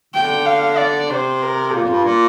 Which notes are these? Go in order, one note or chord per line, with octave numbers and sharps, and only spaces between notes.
D3 G5
F5
D5
C3 C5
A#4
A#2 F4
F2
G2
A#2